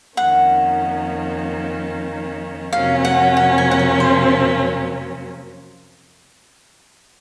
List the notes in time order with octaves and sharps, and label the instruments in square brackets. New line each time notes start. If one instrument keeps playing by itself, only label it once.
[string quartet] F2 D#3 A#3 C#4 [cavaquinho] F#5
[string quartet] F2 C3 F#3 A#3 C#4 [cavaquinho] F5
[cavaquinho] F#5
F#5
G#5
F#5
G#5
C5